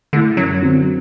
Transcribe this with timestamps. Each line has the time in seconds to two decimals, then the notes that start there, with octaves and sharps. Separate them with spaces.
0.13 D3 A3 E4
0.37 F#2 F#3
0.62 D3 F#3 C4